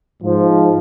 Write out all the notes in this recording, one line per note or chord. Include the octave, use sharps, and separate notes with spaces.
G#2 F3